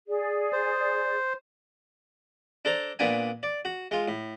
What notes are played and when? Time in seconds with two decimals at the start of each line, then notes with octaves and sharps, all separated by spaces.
0.07 G#4 D5
0.53 C5
2.65 D4 A4 C5 A#5
2.99 A#2 B3 D4 G#5
3.43 D5
3.65 F#4
3.91 G#3 F4
4.08 A2